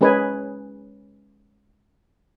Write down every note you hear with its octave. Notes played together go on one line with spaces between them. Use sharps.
G#3 C#4 G#4 B4 D#5 G#5